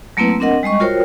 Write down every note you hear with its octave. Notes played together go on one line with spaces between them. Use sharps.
F#3 A3 A#3 C4 E4 B4
C4 D4 A#4 D#5 F#5
G3 G#3 D#5 C#6
F4 F#4 A#4 C5 C#5 G5